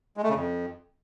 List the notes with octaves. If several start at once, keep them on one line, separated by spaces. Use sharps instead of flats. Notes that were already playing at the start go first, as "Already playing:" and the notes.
G#3
A3
C#3
F2